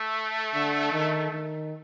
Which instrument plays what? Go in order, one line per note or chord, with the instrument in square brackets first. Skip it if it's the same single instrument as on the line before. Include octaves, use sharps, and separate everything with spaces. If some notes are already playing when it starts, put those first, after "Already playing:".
Already playing: [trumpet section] A3
[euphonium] D3
D#3
D#3